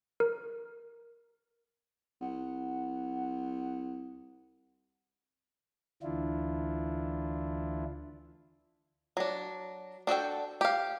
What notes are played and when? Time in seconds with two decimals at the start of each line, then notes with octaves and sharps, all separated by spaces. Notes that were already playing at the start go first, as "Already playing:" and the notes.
0.20 A#4
2.21 C2 F#5
6.03 D2 E3 D4 E4 F4
9.17 F#3 D4
10.07 D4 F#4 A4 G5
10.61 G4 F5